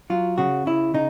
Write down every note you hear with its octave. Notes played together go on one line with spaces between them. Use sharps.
F#3 F4
C#3 F#4
C#3 E4
C#3 D#4